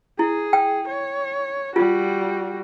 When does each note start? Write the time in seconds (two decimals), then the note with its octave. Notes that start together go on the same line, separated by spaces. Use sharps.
0.19 E4 G#4
0.53 G5
0.88 C#5
1.76 G3 F4 F#4